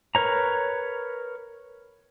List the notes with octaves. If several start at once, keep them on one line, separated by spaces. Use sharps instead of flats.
A#4 B4 C#5 A#5